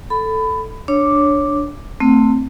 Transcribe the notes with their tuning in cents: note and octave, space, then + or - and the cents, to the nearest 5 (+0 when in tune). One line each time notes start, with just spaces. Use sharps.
A4 +0 B5 +20
D4 +0 C#5 +0 D6 +0
A3 +25 C4 +0